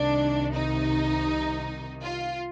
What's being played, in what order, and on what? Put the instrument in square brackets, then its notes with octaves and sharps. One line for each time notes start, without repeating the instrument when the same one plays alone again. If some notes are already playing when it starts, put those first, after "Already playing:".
Already playing: [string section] C2 C3 D#3 D4
D#4
F4